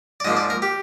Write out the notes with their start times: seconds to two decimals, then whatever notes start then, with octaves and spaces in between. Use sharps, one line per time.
0.20 D5
0.25 G#2 F3 A#3 D#5
0.37 D5
0.50 A#4
0.62 G4